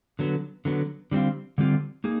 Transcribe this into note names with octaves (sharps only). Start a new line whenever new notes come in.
D3 F#3 B3
D3 F#3 B3
D3 G3 C4 F4
D3 G3 C4 F4
A#3 D#4 G#4